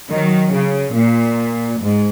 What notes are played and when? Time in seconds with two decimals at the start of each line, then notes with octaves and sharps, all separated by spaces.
0.10 D#3 F#3
0.52 C#3
0.95 A#2
1.79 G#2